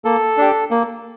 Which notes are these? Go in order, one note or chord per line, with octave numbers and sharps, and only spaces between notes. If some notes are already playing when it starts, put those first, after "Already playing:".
A#3 A4
D4 G4
A#3